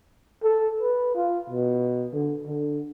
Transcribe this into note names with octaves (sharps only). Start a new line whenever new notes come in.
A4
B4
F4
B2
D3
D3